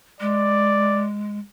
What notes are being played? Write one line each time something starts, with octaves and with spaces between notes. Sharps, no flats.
G#3 D5